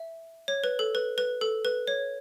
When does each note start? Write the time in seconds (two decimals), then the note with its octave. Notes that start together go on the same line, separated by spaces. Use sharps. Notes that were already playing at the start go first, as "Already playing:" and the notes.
Already playing: E5
0.48 C#5
0.64 B4
0.79 A4
0.95 B4
1.18 B4
1.41 A4
1.65 B4
1.88 C#5